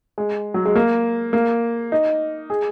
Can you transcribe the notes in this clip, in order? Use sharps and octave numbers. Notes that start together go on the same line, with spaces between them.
G#3
F#3
G#3
A#3
A#3
D#4
G#4